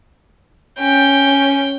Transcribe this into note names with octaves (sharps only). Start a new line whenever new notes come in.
C#4 G5